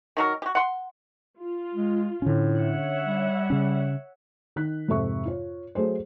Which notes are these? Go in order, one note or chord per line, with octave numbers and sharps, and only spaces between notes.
D#3 F#3 A#4
F#4 G4
F#5 C6
F4
G#3
A2 D3 C#4
C#5 E5 F#5
G3
C#3 C#4
D#3 D#4 F#6 B6
F2 G#2 C3 A4 E5 C#6
F4 C#5
F#3 A3 G#4 C5